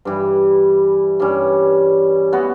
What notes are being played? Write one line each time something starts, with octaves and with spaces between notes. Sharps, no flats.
G2 E3 G3
G2 E3 G3 C#4
E3 B3 F#4